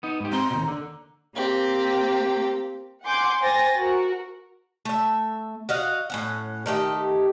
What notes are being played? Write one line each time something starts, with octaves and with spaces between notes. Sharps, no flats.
B3 D#4
G#2 G4
C4 A#5 C6
D#2 B2
D3
A#3 C4 G4
F#5 G#5 C6 D6 G6
C5 G5 G#5 A6 A#6
F#4 A#4
A3 E5
F#4 D#5 F5 F#5
A2 C#4 F#5
D#3 A3 G4 D#5